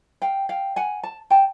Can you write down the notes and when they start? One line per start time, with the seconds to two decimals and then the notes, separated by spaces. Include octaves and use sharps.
0.22 F5 G5
0.49 F5 G5
0.76 F#5 G#5
1.03 A5
1.30 G5 A5